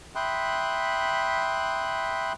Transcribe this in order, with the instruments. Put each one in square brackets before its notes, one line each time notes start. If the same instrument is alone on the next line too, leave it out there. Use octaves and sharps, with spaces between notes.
[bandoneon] E5 G5 B5 C6 D#6 F#6